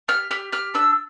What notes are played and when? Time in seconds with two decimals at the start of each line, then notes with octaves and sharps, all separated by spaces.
0.08 G4 F6
0.31 G4 F6
0.52 G4 F6
0.74 D4 E6